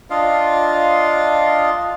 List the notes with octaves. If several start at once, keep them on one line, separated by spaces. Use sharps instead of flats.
D4 F4 D#5 F5